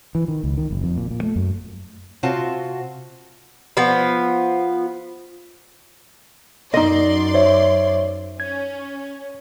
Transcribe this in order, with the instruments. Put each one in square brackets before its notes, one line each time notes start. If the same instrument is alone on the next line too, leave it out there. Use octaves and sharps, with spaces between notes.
[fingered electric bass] E3
D#3
C#2
D#3
F#1
F2
A#2
A#2
A3
F#2
[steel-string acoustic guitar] C3 C4 F4 F#4 A5
[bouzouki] F3 B3
[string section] F#2 D5 C6 [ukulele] D#4 D#5
[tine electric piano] C5 C#5 E5
[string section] C#4 [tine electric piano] G#6